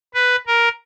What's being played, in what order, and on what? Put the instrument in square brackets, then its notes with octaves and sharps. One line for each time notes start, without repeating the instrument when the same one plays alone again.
[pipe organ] B4
A#4